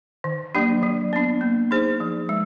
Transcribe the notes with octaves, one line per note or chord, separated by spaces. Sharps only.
D#3
F#3 A#3 D4 G4
F#3
B3 D4
A#3
D#4 G#4 C5
F3
G#3